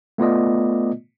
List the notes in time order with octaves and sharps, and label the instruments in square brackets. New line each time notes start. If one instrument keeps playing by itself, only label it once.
[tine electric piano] A3 B3 F4 D5 D#5